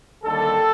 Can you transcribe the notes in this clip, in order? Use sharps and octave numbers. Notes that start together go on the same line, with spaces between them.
D#2 D3 G3 A4